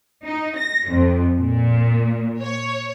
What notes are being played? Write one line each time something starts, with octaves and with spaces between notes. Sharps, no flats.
D#4
A#6
F2
A#2
C#5